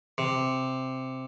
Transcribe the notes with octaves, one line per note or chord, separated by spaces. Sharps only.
C3